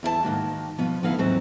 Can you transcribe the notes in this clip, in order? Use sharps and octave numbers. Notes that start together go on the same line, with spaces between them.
E2 E4 A#4 A5
G#2 D#3 A#3 F#4
B2 F3 B3
D2 F3 B3 D#4 E4 F5
D#2 G#2 E3 F#3 C4 D#4